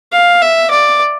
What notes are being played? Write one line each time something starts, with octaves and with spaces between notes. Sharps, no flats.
F5
E5
D5